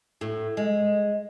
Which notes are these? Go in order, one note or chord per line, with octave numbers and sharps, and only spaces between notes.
A2
G#3